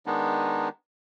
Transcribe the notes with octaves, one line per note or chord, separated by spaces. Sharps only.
D#3 G#3 B3 D4 D#4